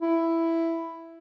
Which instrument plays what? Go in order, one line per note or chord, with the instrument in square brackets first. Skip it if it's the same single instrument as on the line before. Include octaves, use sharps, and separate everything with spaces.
[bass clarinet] E4